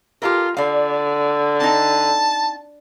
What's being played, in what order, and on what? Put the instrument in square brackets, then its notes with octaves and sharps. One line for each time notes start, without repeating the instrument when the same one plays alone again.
[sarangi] F4 [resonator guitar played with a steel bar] G4 A4 A#4
[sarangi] D3 [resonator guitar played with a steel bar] D5 F5
[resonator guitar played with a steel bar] C4 D#4 [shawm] A5